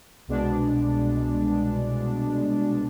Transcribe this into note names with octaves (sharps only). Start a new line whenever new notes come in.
C2 B2 G#3 D4